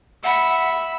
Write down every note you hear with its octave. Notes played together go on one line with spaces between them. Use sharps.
E5 F#5 B5